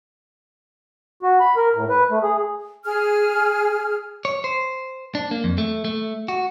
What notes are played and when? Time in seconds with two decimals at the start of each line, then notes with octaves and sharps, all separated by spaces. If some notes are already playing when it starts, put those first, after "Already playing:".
1.23 F#4
1.40 B5
1.56 A#4
1.75 A2
1.89 B4
2.10 A3
2.23 G#4
2.85 G#4 F6
4.25 C#5
4.44 C5
5.15 D4
5.31 A#3
5.44 F2
5.58 A3
5.85 A3
6.28 F#4